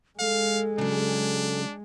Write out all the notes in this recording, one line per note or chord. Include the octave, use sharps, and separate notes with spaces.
G#3 A4 F5
C#3 F#3 D4